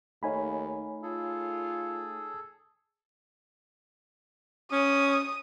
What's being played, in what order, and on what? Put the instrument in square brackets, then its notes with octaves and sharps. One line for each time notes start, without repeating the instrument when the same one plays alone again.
[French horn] D#2 [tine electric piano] A3 D#4 F5 [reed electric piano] C#5 G#5 B5
[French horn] F4 [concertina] G#4 A4
[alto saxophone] C#4 [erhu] D#6